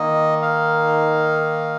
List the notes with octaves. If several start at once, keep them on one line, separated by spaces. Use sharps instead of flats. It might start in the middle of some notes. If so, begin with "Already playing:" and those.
Already playing: D#3 A#3 D#4 D#5
F5